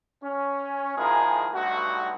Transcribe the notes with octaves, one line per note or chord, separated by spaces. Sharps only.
C#4
D#3 F3 G#3 E4 G#4 A#4
B1 G2 A3 F#4